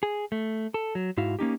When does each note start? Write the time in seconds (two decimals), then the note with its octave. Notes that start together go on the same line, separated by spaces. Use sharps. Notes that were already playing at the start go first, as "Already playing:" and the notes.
0.03 G#4
0.32 A3
0.74 A4
0.95 F#3
1.17 G#2 E4 F#4 F5
1.39 A#3 C#4 D#4 G4